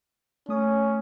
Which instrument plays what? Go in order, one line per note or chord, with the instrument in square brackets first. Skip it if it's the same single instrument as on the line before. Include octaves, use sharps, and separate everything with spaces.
[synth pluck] A3 D#6 [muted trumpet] C#4